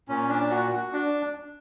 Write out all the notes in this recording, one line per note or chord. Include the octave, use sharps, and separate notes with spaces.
A#2 C#4
D4
F#4
F#4
D4